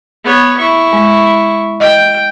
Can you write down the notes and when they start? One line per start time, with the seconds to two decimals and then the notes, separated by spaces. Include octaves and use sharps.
0.24 B3 C#5
0.58 E4 C#6
0.93 G#3
1.80 D#5 G5